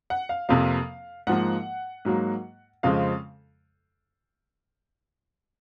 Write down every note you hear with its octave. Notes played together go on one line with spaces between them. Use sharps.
F#5
F5
F2 C3 F3 A#3 F5
G#2 F3 A#3 F#5
G#2 F#3 A#3
F2 C#3 F3 G#3 C4 F5